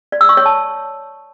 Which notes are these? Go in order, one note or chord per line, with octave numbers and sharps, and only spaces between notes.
D5
E6
C#6
C#5
A5